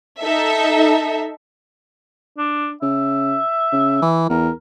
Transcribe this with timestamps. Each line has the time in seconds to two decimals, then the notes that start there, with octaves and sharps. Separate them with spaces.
0.20 D#4 A4 E5
2.38 D4
2.82 C#3 E5
3.73 C#3
4.02 E3
4.30 E2 A#4